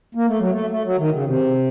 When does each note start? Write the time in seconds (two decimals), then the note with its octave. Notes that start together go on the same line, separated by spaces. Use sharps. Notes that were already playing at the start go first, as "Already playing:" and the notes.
0.15 A#3
0.28 A3
0.39 F#3
0.51 A3
0.70 A3
0.84 F#3
0.98 D#3
1.12 C#3
1.25 C3